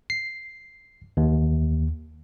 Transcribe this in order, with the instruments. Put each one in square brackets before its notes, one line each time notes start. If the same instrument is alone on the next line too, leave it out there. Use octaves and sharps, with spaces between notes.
[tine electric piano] C7
D#2